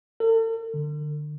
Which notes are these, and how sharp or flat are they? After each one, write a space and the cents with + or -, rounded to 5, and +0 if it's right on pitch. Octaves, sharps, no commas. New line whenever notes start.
A4 +45
D3 +25